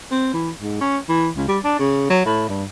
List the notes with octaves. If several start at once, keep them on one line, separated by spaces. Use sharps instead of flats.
C4
E3
G#2
C#4
E3
C#2
G3
D4
C#3
F#3
A2
G2